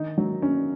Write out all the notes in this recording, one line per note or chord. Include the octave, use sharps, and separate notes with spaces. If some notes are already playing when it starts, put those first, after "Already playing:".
Already playing: D#3 D#4
F#3
C#4